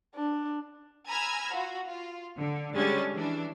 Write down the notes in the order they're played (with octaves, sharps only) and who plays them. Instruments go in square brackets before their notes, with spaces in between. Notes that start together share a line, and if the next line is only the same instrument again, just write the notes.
[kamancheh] D4
[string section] G#5 A#5 B5 E6 F6 G#6
F4 F#4
F4
D3
D3 G3 G#3 C#4 D4 A6
E3 D4